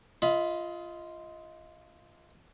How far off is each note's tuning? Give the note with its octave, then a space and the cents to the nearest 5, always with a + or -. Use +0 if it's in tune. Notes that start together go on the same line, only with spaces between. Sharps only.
F4 -10 D#5 +25 B5 +0